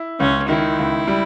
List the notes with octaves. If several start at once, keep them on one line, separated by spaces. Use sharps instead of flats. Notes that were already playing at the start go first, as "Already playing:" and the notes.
Already playing: E4
C#2 C#4
D#3 E4
C#2
G3